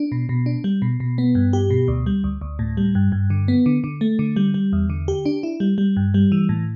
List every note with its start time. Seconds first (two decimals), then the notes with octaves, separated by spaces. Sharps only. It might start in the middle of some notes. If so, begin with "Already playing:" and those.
Already playing: D4
0.12 B2
0.29 B2
0.46 D4
0.64 G3
0.82 B2
1.00 B2
1.18 B3
1.35 G2
1.53 G4
1.70 B2
1.88 D2
2.06 G3
2.24 D2
2.41 D2
2.59 A2
2.77 G3
2.95 G2
3.12 G2
3.30 D3
3.48 B3
3.66 D3
3.84 D3
4.01 A3
4.19 D3
4.36 G3
4.54 G3
4.73 E2
4.90 D3
5.08 G4
5.25 D4
5.43 E4
5.60 G3
5.78 G3
5.97 G2
6.14 G3
6.32 E3
6.49 A2